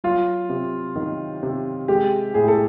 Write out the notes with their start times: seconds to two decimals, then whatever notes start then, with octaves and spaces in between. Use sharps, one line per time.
0.04 F#3 F4
0.49 C3
0.96 D#3
1.43 C3
1.88 G#3 G4
2.34 A2 G#4
2.48 A4